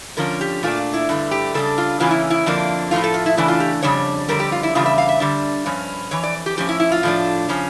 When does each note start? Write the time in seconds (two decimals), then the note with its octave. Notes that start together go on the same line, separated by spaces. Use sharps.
0.17 D3 F3 C#4 A#4
0.41 G4
0.63 A#2 A3 D4 F4
0.94 E4
1.09 G2 D3 A3
1.31 G4
1.54 C#3 G3 D4 A4
1.78 F4
2.00 C#3 E3 A#3 C#4 F4
2.11 E4
2.30 E4
2.46 F2 D3 F3 A#3 D4
2.91 A2 F3 A3 F4
3.04 A4
3.14 F4
3.26 E4
3.37 C#3 E3 A3 D4 E4
3.48 F4
3.60 G4
3.83 F2 C#3 G3 D4 C#5
4.28 F2 D3 G3 A#4
4.40 G4
4.52 F4
4.63 E4
4.75 E2 C#3 G3 D4 F4
4.86 E5
4.98 F5
5.09 E5
5.20 D3 G3 D4
5.66 G2 F3 C#4
6.11 F2 E3 C#5
6.23 D5
6.46 G4
6.57 A2 F3 C#4 G4
6.69 E4
6.80 E4
6.92 F4
7.03 A2 F3 A3 D4
7.49 C#3 F3 C#4